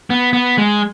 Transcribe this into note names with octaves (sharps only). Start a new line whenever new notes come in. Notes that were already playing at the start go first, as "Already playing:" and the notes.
B3
B3
G#3